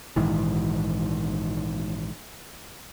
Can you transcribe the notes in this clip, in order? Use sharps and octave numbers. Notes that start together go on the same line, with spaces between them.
A#1 G#2 D#3 E3